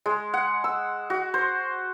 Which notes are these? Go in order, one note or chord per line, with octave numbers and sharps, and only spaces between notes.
G#3
F#5
E6
F#4
C5